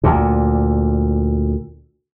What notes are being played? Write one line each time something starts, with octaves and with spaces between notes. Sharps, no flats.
D2 A#2